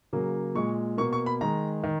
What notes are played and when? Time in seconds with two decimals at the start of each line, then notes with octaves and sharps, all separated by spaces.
0.13 C#3 F#3 A#3
0.55 A#2 G#3 C#6
0.98 B2 A#3 C#6
1.13 C#6
1.26 B5
1.41 D#3 G#3 A#5
1.84 D#3